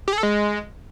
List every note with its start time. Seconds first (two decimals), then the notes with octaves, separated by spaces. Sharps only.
0.08 G4
0.13 G#4
0.18 A4
0.23 G#3